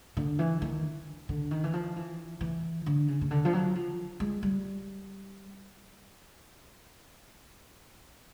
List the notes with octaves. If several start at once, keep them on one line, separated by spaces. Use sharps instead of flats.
D3
E3
D#3
D3
D#3
E3
F3
E3
E3
D3
C#3
C#3
D3
F3
F#3
F3
G#3
G3